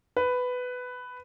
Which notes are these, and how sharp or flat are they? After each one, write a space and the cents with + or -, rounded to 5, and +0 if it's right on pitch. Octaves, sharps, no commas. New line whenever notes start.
B4 +10